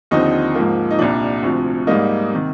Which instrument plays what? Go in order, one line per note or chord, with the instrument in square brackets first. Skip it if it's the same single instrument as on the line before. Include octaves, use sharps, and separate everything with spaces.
[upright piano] D#2 D3 F3 C4 D#4
G#2 F3 A#3
D#4
C2 A#2 G3 D4
D2 C3 F3
G#2 G3 A#3 D#4
C3 D#3